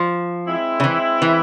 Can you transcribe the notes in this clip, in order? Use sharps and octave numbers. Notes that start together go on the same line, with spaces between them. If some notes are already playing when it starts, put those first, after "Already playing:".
Already playing: F3
G#3 C4 E4
C#3
E3
E3